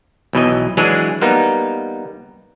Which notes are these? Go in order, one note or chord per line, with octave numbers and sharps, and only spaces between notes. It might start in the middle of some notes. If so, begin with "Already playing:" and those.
B1 B2 E3 D#5
E3 F#3 G#3 D4 G#4
G3 A#3 B3 D#4